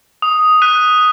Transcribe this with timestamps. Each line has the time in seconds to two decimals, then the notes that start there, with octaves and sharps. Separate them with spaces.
0.22 D#6
0.62 F#6 B6 D#7